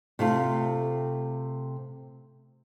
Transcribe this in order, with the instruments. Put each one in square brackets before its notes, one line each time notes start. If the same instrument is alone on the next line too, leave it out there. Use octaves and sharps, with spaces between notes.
[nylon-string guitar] C3 A3 F4